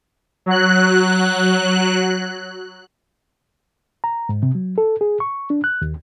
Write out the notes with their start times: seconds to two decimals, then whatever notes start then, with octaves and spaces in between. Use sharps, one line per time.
0.46 F#3 F#6
4.04 A#5
4.29 G#2
4.43 C3
4.55 F#3
4.78 A4
5.01 G#4
5.20 C#6
5.50 D4
5.64 F#6
5.82 D#2